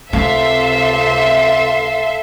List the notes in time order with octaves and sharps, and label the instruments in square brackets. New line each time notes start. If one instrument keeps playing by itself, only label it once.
[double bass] C#2 C3 [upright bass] C4 [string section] A4 E5 C6 [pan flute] F5